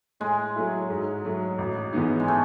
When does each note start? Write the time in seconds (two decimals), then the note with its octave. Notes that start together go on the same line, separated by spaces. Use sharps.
0.20 A2 G#3
0.56 F#3 A3 E4
0.90 G#2
1.25 F#3 A3
1.58 A1
1.93 G#2 E3 B3 D#4
2.20 G#3
2.28 A3